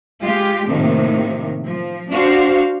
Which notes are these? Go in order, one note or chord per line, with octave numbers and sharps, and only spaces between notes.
G#3 F4 G4
A2 C3 D#3 F3 A#3
F3
D4 F#4 C5 F5